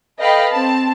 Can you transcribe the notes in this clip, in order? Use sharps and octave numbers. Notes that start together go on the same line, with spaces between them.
A4 B4 D#5 F5 G5 B5
C4 A5